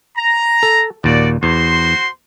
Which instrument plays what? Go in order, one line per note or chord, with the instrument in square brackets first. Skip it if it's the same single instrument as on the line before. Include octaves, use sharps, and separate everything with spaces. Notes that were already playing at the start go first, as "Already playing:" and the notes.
[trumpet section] A#5
[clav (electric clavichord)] A4
[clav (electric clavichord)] D#2 A#2 [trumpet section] F#4 D5
[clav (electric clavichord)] E2 [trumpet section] F#4 C5 C6